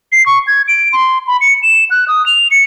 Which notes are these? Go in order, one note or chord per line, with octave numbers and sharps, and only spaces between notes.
C7
C#6
G#6
D7
C6
B5
C#7
E7
F#6
D#6
F7
C#7